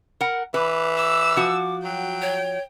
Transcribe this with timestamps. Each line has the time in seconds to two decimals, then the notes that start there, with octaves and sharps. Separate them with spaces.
0.21 A#4 F#5
0.54 E3 B4 D6
0.97 D6 E6
1.37 F3 F#4
1.84 F#3 G5
2.22 C#5